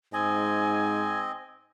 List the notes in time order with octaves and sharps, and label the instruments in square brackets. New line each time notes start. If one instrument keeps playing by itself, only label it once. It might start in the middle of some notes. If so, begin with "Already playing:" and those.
[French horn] G#2 [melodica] C4 D#5 [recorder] G#5